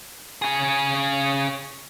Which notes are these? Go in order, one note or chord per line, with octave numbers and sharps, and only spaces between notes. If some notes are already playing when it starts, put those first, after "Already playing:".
C#3 G#4